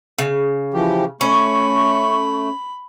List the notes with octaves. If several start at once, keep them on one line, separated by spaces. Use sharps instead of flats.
C#3
E3 F3 G4
A3 C#4 B5 C#6